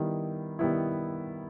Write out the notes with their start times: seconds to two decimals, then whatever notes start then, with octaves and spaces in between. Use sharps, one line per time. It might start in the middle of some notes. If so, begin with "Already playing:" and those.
Already playing: D#3 G3 B3 E4
0.59 D#3 G3 B3 E4